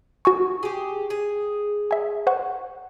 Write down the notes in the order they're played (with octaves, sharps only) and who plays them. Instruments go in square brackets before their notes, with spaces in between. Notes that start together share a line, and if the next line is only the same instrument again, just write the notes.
[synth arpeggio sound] F#4 G#5 C#6
[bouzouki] G4 G#4
G#4
[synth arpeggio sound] E5 G#5
C5 F#5 C#6